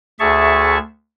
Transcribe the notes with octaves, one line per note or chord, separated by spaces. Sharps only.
D2 G#4 E5 A5 C#6